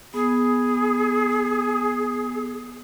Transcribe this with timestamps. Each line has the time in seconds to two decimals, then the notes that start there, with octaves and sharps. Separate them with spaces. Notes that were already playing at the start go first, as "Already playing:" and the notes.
0.14 B3 G#4